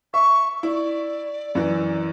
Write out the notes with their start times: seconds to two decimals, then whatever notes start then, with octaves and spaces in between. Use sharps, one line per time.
0.14 E5 C#6
0.63 E4 D5
1.55 F#2 E3